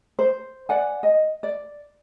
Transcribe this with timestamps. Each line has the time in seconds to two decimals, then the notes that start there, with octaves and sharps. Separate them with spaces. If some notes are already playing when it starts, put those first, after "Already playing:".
0.19 C5
0.69 D5 F#5 G#5
1.03 D#5
1.43 D5